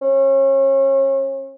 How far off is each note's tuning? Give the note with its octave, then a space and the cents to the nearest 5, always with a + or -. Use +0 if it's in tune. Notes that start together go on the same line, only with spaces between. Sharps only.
C#4 -35